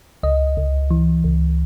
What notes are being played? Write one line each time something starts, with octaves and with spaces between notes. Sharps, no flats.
C#2 D#5
C#2
E3
C#2